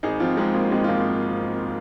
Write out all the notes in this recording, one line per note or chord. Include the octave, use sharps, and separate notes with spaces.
G#1 D#4 G#4
F3 C4 F4
G#2 G#3 C4
G#1 A#3
G#1 G#3 C4
F4
F3 A#3 D#4